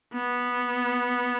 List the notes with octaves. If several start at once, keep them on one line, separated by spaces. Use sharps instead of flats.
B3